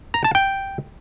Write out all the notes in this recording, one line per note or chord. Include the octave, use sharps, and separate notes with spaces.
A#5
A5
G5